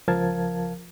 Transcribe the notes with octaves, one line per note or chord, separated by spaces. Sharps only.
C#2 F3 A#4 F5 A5 G#6